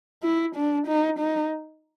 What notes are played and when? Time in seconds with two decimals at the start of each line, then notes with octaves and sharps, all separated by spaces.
0.23 E4
0.56 D4
0.87 D#4
1.19 D#4